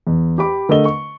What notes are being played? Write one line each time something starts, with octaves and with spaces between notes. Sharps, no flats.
E2
G4 B5 D6
D3 A3 A#4 D#5 G7
C#6